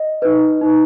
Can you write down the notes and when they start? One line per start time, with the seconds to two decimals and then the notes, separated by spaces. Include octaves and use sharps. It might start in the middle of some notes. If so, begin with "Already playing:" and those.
Already playing: D#5
0.22 D#4 B4
0.61 D#4 B4